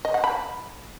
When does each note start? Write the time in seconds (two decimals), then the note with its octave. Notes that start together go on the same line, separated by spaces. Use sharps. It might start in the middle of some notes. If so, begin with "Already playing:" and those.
0.05 D#5
0.14 F#5
0.24 B5